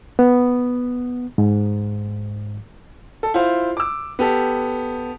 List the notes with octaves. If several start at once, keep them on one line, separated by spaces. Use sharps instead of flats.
B3
G#2
A4
E4 F4 C5 F5
D6 E6
B3 G4 A4